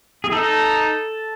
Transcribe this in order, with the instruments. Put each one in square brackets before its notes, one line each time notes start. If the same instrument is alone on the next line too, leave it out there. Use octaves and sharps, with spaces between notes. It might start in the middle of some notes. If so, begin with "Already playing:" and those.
[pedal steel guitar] G#4
[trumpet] D#4 [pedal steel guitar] A4